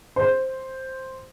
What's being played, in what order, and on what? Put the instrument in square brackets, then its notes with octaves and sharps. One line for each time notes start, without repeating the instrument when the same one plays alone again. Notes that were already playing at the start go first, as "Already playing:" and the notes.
[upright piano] C5